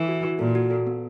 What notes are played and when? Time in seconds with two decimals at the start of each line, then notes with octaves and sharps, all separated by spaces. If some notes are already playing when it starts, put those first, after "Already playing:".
Already playing: E3 A4
0.08 F#4
0.24 F#4
0.39 A#2 A4
0.55 F#4
0.71 A4
0.87 B3